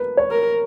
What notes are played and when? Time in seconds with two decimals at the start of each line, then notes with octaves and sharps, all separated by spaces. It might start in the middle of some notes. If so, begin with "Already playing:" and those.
Already playing: A#4 B4
0.17 C#5
0.31 A#4